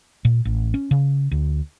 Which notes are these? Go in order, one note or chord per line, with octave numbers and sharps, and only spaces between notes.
A#2
A1
C#4
C#3
D2